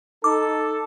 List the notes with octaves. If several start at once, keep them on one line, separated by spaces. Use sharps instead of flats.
D#4 A4 D6